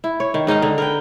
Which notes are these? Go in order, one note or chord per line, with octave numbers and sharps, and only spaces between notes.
E4
C#5
D#3
G#2 D#4 D#5 F5
D3
A#4 B4 G5